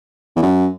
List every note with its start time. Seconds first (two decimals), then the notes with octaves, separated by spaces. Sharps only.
0.36 E2
0.42 F#2